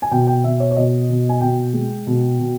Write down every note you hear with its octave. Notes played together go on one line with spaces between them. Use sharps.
G#5
B2 G5
G5
B2 E5
C#5
C#5
B2 D#5
B2
G#5
B2 G5
G#3
B2
B2